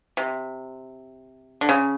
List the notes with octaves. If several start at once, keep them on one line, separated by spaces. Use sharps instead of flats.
C3
D3
C#3